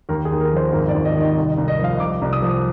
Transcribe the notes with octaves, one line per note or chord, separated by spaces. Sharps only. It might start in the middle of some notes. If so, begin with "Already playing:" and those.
D#2 A#4
G#4
D#2
A#4
F3 C5
G#1 A#4
D5
G#1
D#5
D#3
D#5
C2 D#5
D#5
C2
D#5
F3 F5
C2 D6
C2
D#6
F3